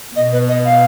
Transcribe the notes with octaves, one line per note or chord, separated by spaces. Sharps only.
B2 D#5
B4
D#5
F5